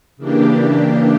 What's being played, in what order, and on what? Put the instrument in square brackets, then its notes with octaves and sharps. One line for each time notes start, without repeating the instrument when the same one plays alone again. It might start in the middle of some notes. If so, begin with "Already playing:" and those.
[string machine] C#3 E3 A#3 D4 G4